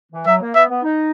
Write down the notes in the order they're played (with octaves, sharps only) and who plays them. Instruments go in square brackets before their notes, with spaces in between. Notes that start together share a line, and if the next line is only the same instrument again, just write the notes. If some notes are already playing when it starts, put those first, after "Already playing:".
[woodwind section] E3
[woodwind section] F#3 [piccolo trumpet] E5
[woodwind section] A#3
[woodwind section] B3 [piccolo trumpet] E5
[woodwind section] B3
D#4